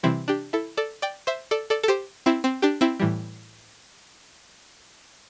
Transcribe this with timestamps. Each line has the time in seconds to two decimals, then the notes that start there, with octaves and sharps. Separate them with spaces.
0.03 C3 E3 G3 C4 E4
0.28 D4 G4
0.53 E4 A4
0.77 A4 D5
1.02 D5 G5
1.27 C5 E5
1.51 A4 D5
1.70 A4 D5
1.83 A4
1.88 G4 C5
2.26 C4 E4
2.44 C4
2.62 D4 G4
2.81 C4 E4
3.00 A2 E3 G3